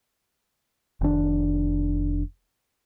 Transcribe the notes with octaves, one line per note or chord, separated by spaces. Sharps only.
F1 D#3 D4